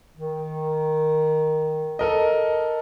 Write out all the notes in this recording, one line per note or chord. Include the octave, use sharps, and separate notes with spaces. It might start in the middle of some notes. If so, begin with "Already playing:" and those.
D#3
A4 A#4 D#5